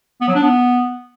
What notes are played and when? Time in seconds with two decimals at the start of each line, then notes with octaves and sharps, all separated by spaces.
0.21 B3
0.28 F#3
0.35 D4
0.42 B3